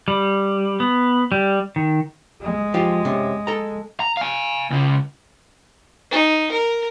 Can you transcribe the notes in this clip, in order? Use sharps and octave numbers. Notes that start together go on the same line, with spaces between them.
G3
B3
G3
D#3
G#3
F3 F4 G4
C3 C#4
A4 A#5
A#5
F5 G#5
C#2 C#3
D#4
A#4